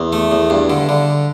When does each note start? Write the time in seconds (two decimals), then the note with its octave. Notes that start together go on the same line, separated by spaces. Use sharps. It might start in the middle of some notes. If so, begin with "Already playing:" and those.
Already playing: E2
0.13 A3
0.31 E2
0.50 G2
0.70 D3
0.89 D3